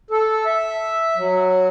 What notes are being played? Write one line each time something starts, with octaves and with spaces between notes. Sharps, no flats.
A4
E5
F#3